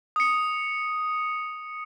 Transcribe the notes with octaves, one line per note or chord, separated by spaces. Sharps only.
D#6 C#7